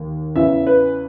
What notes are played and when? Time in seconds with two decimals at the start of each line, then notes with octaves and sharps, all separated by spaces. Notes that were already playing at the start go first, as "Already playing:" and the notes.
Already playing: D#2
0.35 E2 C#3 E3 E5
0.67 B4